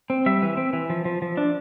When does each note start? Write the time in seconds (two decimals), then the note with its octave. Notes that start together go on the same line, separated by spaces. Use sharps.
0.10 C4
0.26 G3 E5
0.42 E3
0.57 C4
0.73 E3
0.90 F3
1.05 F3
1.22 F3
1.37 D4